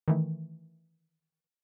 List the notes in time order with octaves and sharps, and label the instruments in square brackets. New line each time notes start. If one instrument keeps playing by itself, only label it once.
[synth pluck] D#3 E3 A3